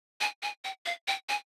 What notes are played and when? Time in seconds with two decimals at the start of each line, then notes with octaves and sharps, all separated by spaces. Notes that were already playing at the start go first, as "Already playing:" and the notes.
0.21 G#5
0.43 G#5
0.64 G5
0.86 F5
1.08 G5
1.29 G#5